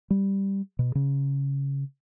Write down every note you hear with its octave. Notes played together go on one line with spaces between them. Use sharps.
G3
B2
C#3